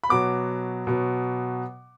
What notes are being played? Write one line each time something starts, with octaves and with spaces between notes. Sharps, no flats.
B5
B2 F#3 B3 D6
B2 F#3 B3